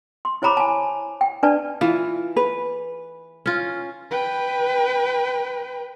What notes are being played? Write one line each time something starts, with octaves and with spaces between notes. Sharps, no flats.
C6
E4 C5 C#5 A#5 B5 D6
G#5 A5
G5
D4 B4 D5 A5
E3 F4
B4
C#4 F4
B4 G5